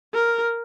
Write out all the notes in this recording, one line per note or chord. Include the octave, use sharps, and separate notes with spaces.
A#4